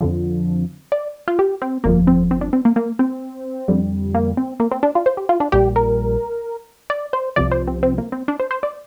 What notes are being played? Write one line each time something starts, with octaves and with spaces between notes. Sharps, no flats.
F2 D3 F3
D5
F4
G4
C4
G1 F2 F3 A#3
C4
C4
D4
C4
A#3
A#3
C4
F2 D3 G3
A#3
C4
A#3
C4
D4
F4
C5
G4
F4
D4
A#1 A#2 G3 G4
A#4
D5
C5
C2 C3 F3 D5
C5
C4
C4
A#3
C4
D4
C5
C5
D5